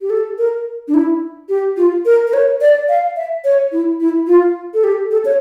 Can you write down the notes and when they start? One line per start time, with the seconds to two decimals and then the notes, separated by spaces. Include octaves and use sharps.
0.01 G4
0.10 A4
0.38 A#4
0.88 D4
0.94 E4
1.49 G4
1.77 F4
2.05 A#4
2.27 A#4
2.33 C#5
2.61 D5
2.89 F5
3.16 E5
3.44 C#5
3.72 E4
4.00 E4
4.27 F4
4.74 A4
4.84 G4
5.11 A4
5.25 C#5